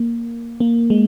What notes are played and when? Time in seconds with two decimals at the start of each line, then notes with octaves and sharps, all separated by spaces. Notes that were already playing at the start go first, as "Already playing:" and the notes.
Already playing: A#3
0.60 A#3
0.90 G#3